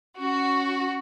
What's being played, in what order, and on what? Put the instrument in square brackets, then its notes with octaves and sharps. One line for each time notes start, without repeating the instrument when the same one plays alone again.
[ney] C#4 [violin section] F#4